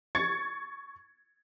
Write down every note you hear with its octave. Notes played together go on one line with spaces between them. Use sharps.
C#6 G#6 A6 C#7